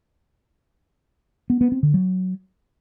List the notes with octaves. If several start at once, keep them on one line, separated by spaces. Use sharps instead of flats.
B3
B3
C4
D3
F#3